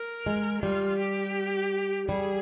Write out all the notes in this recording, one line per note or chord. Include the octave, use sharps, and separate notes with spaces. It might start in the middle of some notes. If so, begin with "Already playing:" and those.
Already playing: A#4
G#3
G3 F4
G4
G3 G#4